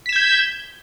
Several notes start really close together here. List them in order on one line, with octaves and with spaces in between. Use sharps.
B6 E7 G#6 G6